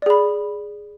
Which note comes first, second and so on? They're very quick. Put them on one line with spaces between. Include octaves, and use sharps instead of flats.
D5 G#4 B5